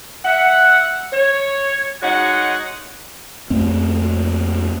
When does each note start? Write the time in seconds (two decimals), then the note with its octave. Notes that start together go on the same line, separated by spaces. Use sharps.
0.24 E5 F#5
1.12 C#5
2.02 G#3 D#4 F#4 C#5 F#5
3.50 F2 A3 A#3 C4